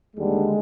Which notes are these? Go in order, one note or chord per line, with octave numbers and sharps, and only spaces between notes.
D#2 D3 G3 G#3